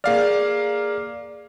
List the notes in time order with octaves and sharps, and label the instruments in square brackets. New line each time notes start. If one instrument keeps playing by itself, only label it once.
[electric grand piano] A#3 F5 F6 [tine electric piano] G#4 D5